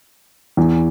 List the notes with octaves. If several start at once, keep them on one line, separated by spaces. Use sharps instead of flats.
E2 E3